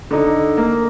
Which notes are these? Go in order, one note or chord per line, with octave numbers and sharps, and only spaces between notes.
D3 D#4
A#3